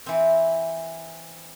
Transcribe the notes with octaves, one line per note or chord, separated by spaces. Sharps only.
E3 C4